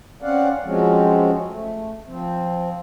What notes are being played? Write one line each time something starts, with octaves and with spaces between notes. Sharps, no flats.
C4 C#4 D5 F5 F#5
F3 F#3 G#3 C4 C#4
A3
F3 C4